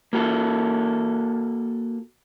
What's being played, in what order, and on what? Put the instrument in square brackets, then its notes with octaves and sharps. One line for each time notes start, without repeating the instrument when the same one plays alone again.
[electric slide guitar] A#3 F#4 A4